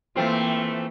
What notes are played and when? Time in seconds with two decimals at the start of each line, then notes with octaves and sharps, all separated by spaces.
0.16 E3 A3 A#3 C4 F4